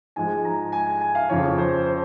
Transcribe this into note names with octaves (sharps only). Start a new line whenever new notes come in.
G#2 F3 G#3 G#5
A#5
G#5
G#5
G#5
F5
F2 C#3 F3 C#5
C5
C5